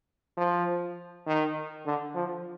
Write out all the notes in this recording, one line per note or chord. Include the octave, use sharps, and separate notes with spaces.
F3
D#3
D3
F3